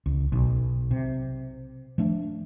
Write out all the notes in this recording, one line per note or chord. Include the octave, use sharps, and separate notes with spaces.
C#2
B1
C3
F3 A3 D4